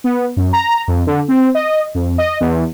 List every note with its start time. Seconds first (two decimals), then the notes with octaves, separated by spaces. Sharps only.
0.04 B3
0.37 F#2
0.53 A#5
0.88 F2
1.07 D3
1.28 C4
1.55 D#5
1.94 F2
2.18 D#5
2.40 E2